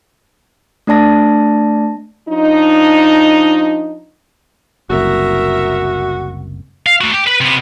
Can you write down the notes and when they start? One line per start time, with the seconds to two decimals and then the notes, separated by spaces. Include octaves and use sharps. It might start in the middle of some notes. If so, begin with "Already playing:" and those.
0.87 A3 D4 D5 A5 A#6
2.29 F3 D4 D#4
4.90 F#1 C2 F#4 A#4 E5
6.86 F5
7.01 A3 F#4
7.13 G4
7.26 B4 B5
7.41 C3 B3